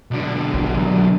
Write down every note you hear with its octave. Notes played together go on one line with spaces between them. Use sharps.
B1 D3
A#1
F#3